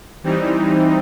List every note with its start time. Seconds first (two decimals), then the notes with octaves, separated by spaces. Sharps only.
0.23 E3 G3 C4 D#4